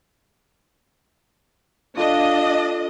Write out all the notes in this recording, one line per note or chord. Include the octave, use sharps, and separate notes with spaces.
D4 F4 A4 D#5